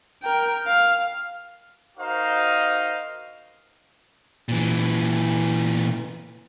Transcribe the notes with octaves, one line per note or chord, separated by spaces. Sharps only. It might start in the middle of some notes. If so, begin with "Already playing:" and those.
A#4 G5
F5
D#4 F#4 A#4 C5 D#5 F5
A#2 E3